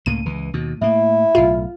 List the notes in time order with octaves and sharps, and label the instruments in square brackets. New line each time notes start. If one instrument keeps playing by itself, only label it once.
[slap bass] C#2 A2 A#3 [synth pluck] D#7
[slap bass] C#2 E3
D#2 B2
[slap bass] A2 A#3 [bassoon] E4
[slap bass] B1 A2 [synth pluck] F4